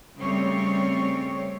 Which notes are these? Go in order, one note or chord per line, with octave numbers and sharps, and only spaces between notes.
C#3 G3 A3 C4 C#5